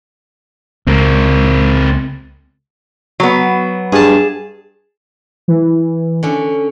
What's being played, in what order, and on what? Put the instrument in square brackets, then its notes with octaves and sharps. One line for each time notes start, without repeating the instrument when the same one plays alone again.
[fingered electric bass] C#2 [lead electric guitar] C4 A#4
[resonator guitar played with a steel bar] F#3 B3
[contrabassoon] G2 [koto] G#4 A5
[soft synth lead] E3
[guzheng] D3 C#4